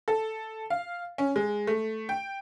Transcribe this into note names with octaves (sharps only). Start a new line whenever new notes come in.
A4
F5
C#4
G#3
A3
G5